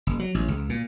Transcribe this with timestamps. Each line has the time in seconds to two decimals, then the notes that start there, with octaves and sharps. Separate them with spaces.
0.07 F#1
0.19 F#3
0.35 A1
0.48 C#2
0.69 A#2